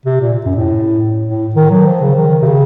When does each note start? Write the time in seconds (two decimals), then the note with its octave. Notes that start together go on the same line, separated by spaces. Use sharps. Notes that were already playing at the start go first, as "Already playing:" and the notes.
0.06 C3
0.21 A#2
0.45 F#2
0.56 A2
1.26 A2
1.56 D#3
1.71 F#3
1.86 F3
2.01 C#3
2.16 D#3
2.42 C3
2.46 C#3